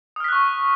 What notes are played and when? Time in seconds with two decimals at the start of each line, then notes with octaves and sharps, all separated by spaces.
0.16 D#6
0.20 F6
0.24 B6
0.28 F#6
0.32 C#6